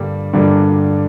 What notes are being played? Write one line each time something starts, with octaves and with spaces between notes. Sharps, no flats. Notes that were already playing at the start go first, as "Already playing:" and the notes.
Already playing: G2 D3 G3 A#3
G2 D3 G3 A#3 D4